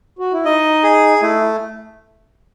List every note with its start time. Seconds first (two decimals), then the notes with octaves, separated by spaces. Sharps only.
0.19 F#4
0.33 E4
0.45 D#4 D#5
0.83 G#4
1.22 A3 E4